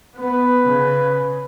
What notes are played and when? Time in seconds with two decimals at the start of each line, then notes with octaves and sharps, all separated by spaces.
0.19 B3 B4
0.64 C#3